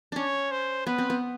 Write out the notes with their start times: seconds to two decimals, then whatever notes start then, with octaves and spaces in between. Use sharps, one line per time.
0.12 C#4 D4 C#5
0.51 C5
0.87 B3 B4
0.98 C4
1.10 B3